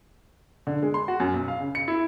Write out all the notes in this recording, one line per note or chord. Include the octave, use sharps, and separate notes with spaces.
D3
G#3
C6
F#4
F#2
B1
F5
C#3
C#7
E4